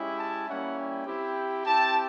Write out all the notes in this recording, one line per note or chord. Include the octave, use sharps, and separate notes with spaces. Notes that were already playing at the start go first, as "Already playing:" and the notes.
Already playing: G#3 C#4 E4 G4
A5
G3 A#3 C#4 E4 F#5
G5
C4 E4 G4
C4 E4 G4 A5